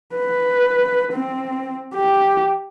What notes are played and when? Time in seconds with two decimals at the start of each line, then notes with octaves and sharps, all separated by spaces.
0.16 B4
1.13 C4
1.95 G4